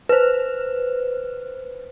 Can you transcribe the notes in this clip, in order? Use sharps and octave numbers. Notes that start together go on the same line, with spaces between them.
B4 C5